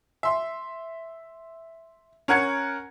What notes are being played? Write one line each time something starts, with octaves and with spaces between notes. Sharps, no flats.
E5 C6
C#4 A#4 F#5 G#6 C#7